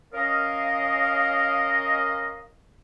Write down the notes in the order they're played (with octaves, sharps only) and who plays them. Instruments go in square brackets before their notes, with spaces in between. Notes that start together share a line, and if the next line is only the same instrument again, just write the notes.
[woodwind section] C#4 A#4 D#5 F5